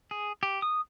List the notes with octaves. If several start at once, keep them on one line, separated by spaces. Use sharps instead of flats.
G#4
G4
D#6